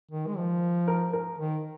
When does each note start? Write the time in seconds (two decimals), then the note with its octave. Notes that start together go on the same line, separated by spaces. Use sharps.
0.11 D#3
0.27 G#3
0.37 F3
0.88 A#4
1.13 A#4
1.39 D#3